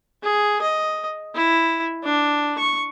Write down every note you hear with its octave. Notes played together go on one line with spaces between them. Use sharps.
G#4
D#5
E4
D4
C#6